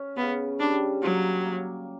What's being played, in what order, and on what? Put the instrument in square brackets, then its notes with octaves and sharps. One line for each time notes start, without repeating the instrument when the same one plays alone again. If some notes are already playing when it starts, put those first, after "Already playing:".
Already playing: [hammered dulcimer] C#4
[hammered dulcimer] C#3 [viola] B3
[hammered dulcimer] G3 [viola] D4
[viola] F#3 [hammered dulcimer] A#3
[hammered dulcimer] A#3